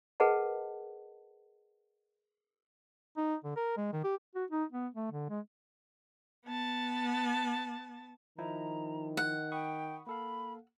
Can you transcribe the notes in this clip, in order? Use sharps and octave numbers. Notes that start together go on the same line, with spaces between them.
G#4 A#4 B4 D#5 F#5 A5
D#4
D3
A#4
G#3
D#3
G4
F#4
D#4
B3
A3
D3
G#3
B3 A5
D#3 F3 D#4 E4 A#5
F#5
G5 B5 C#6 D#6
A#3 A4 F5 B5